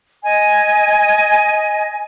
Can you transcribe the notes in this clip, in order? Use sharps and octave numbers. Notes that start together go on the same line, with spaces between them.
D#5 G#5